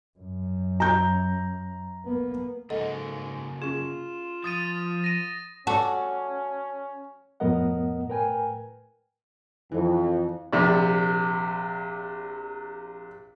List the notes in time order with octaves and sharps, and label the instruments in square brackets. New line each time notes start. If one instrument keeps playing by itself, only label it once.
[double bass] F#2
[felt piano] A#5 G6
[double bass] A#3 B3
[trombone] G#2 [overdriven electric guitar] C#3 A#3 [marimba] A4 D#5 F#5
[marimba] C#4 G#4 [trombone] F4 [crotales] E7
[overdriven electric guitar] F3 [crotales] D#6 A6 D#7
[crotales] A#6 D#7
[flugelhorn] C#4 [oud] F#4 [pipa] A4 D5
[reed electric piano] F2 A2 B3 A#4 D#5 F#5
A2 A#4 B4 G5 G#5
[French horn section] F2 [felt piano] E3
[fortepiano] A#1 C3 D5